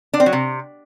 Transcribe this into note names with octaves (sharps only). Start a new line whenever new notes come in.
D4
C4
F#3
C3